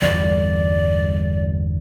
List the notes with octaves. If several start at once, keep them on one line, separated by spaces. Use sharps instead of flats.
G1 E2 G3 D5